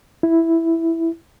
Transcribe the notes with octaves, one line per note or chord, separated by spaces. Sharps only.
E4